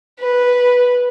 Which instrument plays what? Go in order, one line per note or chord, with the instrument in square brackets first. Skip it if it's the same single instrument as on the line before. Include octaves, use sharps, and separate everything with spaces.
[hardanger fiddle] B4